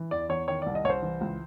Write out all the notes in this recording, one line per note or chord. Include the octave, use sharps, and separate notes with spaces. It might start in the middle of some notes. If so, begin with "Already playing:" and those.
Already playing: E3
E2 D5
E2 C#5
D#3 C#5
D5
C2
D#5
C2 C#5
C5
E3
C#2